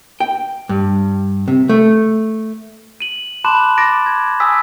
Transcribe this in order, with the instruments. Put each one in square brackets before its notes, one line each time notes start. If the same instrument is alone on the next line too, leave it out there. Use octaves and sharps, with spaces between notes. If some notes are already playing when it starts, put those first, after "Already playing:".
[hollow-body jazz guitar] G5
G2
C3
A3
[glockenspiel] D#7 F#7
A5 B5 C6 D6 F#6 E7
D6 A6 A#6 D7
G#6
G#5 D#6 E6 B6